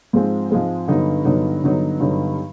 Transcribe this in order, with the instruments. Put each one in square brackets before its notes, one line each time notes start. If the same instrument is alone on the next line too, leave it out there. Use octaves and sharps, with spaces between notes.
[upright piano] G#2 F3 G#3 C4
G#2 F3 G#3 C4
G2 D3 F#3 B3 D#4
G2 D3 F#3 B3 D#4
G2 D3 F#3 B3 D#4
G2 D3 F#3 B3 D#4